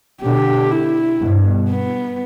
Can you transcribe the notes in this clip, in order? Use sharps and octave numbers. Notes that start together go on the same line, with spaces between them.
B2 D3 G4
E4
G2 B2
B3